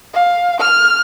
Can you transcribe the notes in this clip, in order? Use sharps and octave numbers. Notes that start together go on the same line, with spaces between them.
F5
F6